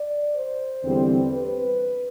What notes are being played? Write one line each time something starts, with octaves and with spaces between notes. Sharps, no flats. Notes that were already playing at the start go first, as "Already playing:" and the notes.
Already playing: D5
C5
E2 D3 G3 C4
B4